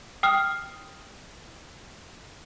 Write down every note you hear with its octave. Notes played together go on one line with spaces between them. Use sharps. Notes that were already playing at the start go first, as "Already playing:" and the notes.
G5 D#6 F6